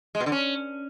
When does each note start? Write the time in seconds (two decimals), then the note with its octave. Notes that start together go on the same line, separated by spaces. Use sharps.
0.15 G#3
0.20 B2
0.26 D3
0.32 C#4